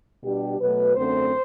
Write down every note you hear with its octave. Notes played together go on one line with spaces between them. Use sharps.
B2 G3 D4 G4
B2 F#3 A3 B4
F#2 D3 A3 C4 C5